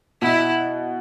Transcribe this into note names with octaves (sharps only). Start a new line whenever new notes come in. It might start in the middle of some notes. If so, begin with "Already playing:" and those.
B2 E4